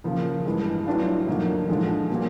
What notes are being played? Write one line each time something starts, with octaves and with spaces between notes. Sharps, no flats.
C#3 F3 A#3
G2 E3 G#3
A2 F#3 B3 D4 F4
F#2 D3 F3 A#3 D#4
D3 F3 G#3
A#2 F#3 A#3